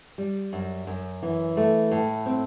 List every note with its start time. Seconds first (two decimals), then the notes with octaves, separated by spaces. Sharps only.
0.18 G3
0.53 F#2
0.87 F#2
1.23 E3
1.57 A3
1.91 A2
2.26 C4